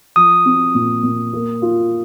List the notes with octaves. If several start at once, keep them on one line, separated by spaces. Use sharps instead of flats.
F3 D#6
C4
A#2
A#2
A#3
F4